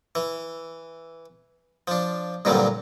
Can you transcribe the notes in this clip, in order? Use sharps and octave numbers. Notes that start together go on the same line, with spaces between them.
E3
F3 D4
C2 G2 A#2 D3 F#3 G3